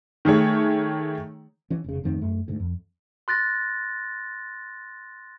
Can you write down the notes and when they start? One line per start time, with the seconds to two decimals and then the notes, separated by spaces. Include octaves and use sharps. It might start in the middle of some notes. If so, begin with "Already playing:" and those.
0.25 D#3 A3 G#4 C#5
1.70 E3 C#4
1.84 F1 C#3
2.04 F2 A2 D#3 C4
2.21 F#2 A3
2.48 D2 G#2
2.60 F2
3.28 C6 F#6 A6 A#6